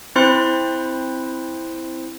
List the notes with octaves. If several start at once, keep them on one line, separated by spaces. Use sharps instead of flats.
C4 E4 C5 B5 C6 F#6